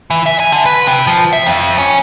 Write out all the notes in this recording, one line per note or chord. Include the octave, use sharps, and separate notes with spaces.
E3
E5
G#5
D3
B4
C3
F3
E5
F2
C#4